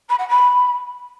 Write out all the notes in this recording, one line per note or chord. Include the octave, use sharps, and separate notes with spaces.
B5
F#5
B5